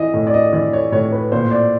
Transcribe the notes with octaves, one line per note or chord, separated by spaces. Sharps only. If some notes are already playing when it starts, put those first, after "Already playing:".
Already playing: E3 D#5
A2 D#5
D5
D#5
E3 D5
C#5
A2 C#5
B4
A#2 C5
D5